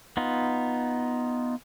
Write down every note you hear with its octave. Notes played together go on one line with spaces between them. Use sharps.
B3 D#4 F4